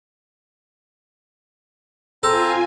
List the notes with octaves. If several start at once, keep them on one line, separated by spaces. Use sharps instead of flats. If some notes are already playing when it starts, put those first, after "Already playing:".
C4 F4 A4 C5 G#5 A#5